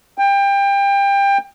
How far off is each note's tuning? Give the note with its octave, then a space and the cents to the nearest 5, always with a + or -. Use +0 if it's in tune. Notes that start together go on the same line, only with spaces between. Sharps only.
G5 +25